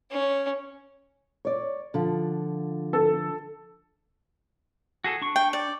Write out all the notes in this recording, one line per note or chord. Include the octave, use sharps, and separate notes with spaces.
C#4
C#5 D5
D3 F3
A4
F#4 G#4 A4
D4 C#6
G5
D5